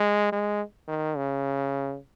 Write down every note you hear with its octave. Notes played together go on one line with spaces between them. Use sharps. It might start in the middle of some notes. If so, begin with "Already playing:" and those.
Already playing: G#3
G#3
D#3
C#3